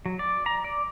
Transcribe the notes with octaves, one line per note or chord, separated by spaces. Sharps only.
F#3
D5
A#5
D5